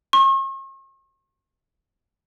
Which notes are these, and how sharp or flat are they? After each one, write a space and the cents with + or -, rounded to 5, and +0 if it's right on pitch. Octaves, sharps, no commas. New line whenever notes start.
C#6 -45